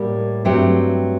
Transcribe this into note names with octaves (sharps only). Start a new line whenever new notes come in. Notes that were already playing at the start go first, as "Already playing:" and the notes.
Already playing: A2 G3 A#3
G2 F#3 A3 C4 G4